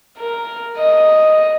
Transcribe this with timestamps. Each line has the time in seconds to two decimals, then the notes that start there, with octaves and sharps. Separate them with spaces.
0.18 A#4
0.78 D#5